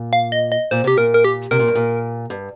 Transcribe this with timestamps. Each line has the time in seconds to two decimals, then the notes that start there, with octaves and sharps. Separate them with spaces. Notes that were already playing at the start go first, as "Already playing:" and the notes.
Already playing: A#2
0.13 F5
0.32 D#5
0.52 D#5
0.71 A#2 C5
0.84 C3 G4
0.97 A#2 A#4
1.14 A#4
1.24 G4
1.51 C3 A#4
1.59 A#2
1.67 G2
1.75 A#2
2.30 G2